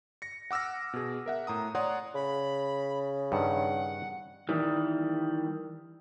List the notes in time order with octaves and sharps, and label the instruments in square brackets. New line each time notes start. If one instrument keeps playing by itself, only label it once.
[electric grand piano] A#6 C#7
F#5 D6 E6 F6 A#6
B2 G#4
A#4 E5 F#5
A2 A#5 D#6
C#5 D5 F#5 A#5 C6 D#6
[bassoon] C#3 [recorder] B5
[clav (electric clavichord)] G2 D#3 [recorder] F#5
[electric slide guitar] D#3 E3 G3